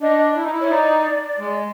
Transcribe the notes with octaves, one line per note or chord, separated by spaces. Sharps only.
D4 D#5
E4
D#4
E4
C#5
D#4 D5
G#3